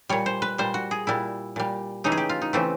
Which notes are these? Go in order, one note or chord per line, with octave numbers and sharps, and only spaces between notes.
A#2 G3 C#5
C5
B4
A#2 G3 C5
F#4
G#4
A#2 G3 E4
A#2 G3
C#3 E3 A3 D#4
G#4
G4
F4
D#4
C#3 E3 A3 C4